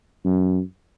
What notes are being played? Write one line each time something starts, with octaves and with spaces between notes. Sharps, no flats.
F#2